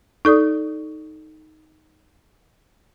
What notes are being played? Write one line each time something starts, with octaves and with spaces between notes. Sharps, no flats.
D#4 A4 D5 D#6